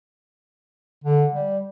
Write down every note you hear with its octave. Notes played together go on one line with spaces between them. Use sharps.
D3
G3